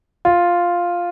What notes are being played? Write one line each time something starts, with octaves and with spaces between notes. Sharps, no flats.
F4